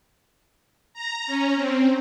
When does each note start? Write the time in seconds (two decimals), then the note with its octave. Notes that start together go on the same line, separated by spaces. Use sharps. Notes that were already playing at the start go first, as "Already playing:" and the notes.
0.94 A#5
1.27 C#4
1.56 C4